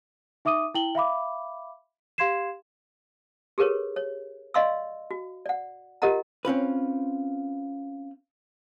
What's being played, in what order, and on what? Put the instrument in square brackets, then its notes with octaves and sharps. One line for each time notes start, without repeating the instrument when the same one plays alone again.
[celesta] D#4 E5 D6 D#6 D#7
E4 G5 F#7 G7
E5 F5 B5 D6
G4 F5 C6 G#6 C7 E7
[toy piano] G4 G#4 A#4 B4 C#5
C#5
D5 D#5 F5 C6 C#6 E6
F#4
D5 F#5
F4 G4 A#4 D#5 F#5 A#5
[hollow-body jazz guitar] C4 C#4 F4 B4